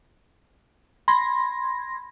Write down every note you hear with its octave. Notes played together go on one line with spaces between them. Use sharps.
B5 C6 G#6 A#6